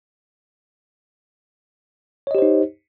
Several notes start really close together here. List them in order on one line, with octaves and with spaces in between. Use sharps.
C#5 D#5 G4 C5 D#4